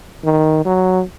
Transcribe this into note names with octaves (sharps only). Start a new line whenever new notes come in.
D#3
F#3